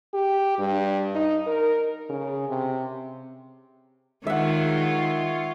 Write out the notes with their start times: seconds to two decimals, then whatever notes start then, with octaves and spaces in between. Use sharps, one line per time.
0.14 G4
0.59 G2
1.15 D#4
1.47 A#4
2.09 C#3
2.49 C3
4.27 D#3 G#3 F4 C#5 E5 F#5